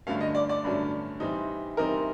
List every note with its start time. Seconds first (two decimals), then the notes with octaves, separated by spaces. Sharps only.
0.07 G2 D3 F#3 A3 C#4 F5
0.20 D#5
0.35 D5
0.49 D5
0.64 G2 D3 F#3 A3 C#4
1.20 C3 E3 G3 C4 D#4
1.77 C3 E3 G3 C4 D#4 A#4